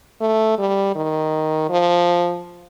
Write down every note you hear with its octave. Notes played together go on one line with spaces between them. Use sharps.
A3
G3
D#3
F3